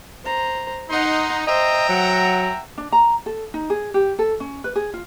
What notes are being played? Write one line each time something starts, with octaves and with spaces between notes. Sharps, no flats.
C5 A#5
D#4 F#5 C6
C5 D#5 E5 G5 A#5
F#3 F#5
D4
A#5
A4
D#4
G#4
G4
A4
C#4
B4
G#4
F4